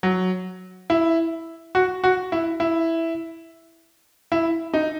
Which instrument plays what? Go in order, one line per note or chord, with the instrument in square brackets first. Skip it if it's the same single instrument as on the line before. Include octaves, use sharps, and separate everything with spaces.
[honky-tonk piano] F#3
E4
F#4
F#4
E4
E4
E4
D#4